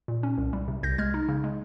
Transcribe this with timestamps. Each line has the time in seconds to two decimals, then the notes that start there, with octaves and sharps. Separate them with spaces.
0.08 A#2
0.23 C#4
0.38 C2
0.53 G3
0.68 C3
0.83 C2 G6 A#6
0.98 G#3 F6 G#6
1.14 D#4
1.28 C#3
1.44 G#3